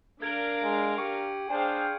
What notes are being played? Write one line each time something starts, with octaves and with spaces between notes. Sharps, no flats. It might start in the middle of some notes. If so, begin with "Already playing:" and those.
D4 A#4 F5 G#6 D7 F#7
G#3
G4 C#6 C#7
D4 G#4 C5 F5 G5